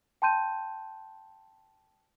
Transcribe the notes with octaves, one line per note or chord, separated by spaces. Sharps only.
G5 A5 C6 G6 D#7